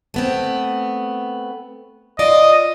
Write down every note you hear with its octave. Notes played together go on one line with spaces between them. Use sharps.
A3 B3 C4
F4 D5 D#5